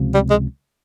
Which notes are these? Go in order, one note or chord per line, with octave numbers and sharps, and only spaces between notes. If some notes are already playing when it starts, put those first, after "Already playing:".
Already playing: C#2 C3 F3
G3
G#3